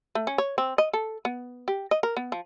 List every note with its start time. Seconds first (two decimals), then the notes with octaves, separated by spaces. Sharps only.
0.15 A3
0.27 C#4
0.38 C#5
0.58 C4
0.78 D#5
0.93 A4
1.25 B3
1.68 G4
1.91 D#5
2.03 A#4
2.17 B3
2.32 F3